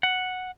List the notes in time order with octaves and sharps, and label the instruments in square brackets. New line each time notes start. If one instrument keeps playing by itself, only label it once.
[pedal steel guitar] F#5